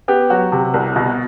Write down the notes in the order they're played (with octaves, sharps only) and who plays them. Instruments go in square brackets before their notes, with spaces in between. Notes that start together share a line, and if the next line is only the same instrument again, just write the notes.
[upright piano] B3 G4
F#3 F#4
C3
C2
B2